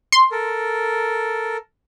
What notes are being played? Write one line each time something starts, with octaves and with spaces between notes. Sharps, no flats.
C6
A4 A#4